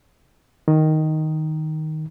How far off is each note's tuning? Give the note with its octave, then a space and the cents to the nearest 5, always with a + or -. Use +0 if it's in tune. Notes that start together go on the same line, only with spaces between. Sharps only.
D#3 +0